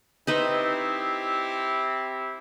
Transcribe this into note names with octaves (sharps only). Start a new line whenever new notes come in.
C4 D#4 E4 G4 B4 C5